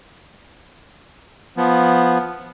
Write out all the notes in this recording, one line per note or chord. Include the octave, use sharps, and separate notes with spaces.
F3 B3